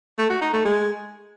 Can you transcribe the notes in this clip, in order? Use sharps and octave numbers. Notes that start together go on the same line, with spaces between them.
A3
F#4
D#4
A3
G#3